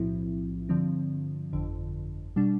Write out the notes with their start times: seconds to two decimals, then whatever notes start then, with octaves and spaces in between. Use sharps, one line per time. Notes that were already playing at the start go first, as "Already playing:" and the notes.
Already playing: B1 A2 F3 C4 E4
0.69 G2 D3 F3 C4
1.53 G1 F2 D3
2.36 B2 G3 D4